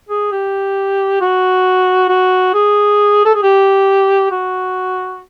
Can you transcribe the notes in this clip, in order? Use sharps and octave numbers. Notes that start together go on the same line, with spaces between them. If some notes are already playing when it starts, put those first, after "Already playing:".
G#4
G4
F#4
F#4
G#4
A4
G#4
G4
F#4